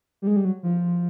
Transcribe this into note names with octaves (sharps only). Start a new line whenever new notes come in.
G3
G#3
G3
F#3
F3